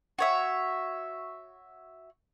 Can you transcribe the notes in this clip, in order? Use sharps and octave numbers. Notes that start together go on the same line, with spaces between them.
F#4 C#5 E5